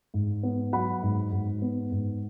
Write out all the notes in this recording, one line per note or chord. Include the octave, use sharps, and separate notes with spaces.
G#2
B3
F#3 F#5 B5
G#2
G#2
B3
G#2